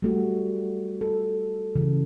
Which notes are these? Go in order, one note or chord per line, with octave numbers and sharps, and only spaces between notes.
G3 A3 F#4
A4
C#3 E3